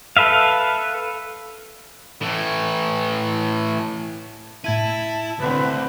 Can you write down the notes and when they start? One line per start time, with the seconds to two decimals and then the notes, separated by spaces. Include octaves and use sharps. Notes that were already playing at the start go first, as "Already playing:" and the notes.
0.17 A4 B4 E5 F5
2.22 A2 E3
4.64 A2 E4 A5 G#6 D#7
5.40 D2 D3 C4 B4